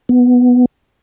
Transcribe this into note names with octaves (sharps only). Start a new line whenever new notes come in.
B3